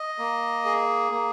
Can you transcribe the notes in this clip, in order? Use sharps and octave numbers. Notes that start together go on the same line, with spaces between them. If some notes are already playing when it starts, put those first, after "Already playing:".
Already playing: D#5
A#3
G#4
A#3